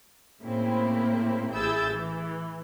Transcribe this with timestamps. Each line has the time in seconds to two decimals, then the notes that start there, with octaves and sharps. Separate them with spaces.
0.42 A2 C#3 A#3 C4 E4
1.52 A1 E4 G#4 E6 G6 A6
1.93 E3